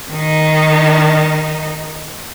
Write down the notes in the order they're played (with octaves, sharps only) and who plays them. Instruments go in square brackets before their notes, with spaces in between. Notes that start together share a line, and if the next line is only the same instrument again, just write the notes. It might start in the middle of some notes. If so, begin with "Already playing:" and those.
[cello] D#3 D#4